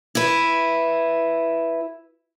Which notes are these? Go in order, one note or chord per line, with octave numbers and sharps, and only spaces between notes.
E4 B4